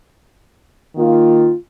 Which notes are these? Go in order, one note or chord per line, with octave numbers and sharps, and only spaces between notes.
D#3 A#3 F4